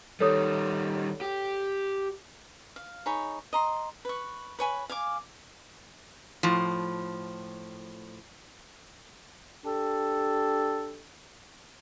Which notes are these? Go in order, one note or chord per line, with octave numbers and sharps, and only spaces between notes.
D#3 G3 A4 C#5 D#6
G4
F5
D#4 G#4 C#5 B5
D#5 A#5 C6
B4 C#6
B4 C#5 G#5 B5
F5 G#5 D6
A2 F3
D4 G4 A4